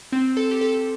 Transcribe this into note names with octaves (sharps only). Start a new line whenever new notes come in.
C4
A4
G4
A4